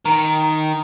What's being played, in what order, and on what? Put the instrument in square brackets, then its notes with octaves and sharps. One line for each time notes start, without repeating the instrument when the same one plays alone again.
[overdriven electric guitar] D#3 [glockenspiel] A#5
[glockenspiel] A#5